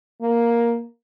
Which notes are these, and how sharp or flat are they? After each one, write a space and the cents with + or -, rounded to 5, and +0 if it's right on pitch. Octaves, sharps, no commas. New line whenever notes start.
A#3 +5